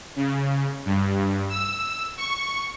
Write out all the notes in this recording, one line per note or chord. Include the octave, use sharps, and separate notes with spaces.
C#3
G2
E6
C#6